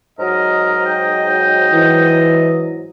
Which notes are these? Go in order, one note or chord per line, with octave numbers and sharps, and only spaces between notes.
G#2 F#3 A#4 D#5
G5
E3